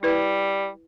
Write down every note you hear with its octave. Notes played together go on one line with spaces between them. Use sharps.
G3 E4 B4